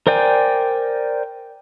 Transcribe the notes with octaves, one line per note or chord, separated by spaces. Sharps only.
A#4 C5 D5 G5 G#5